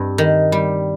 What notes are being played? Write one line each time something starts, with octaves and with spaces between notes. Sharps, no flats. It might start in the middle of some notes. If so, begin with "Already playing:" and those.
Already playing: G2 G3 C4
D#3
G3